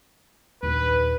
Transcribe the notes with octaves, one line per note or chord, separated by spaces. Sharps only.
A#1 D#2 B4